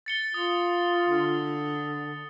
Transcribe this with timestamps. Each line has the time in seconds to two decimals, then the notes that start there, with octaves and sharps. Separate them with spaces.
0.06 A6 C#7 G7
0.34 F4 D#6
1.07 D3